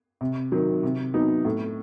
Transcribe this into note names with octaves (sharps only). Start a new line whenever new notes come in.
C3
D#3 F#3
C3
F#3 B3 D#4
A2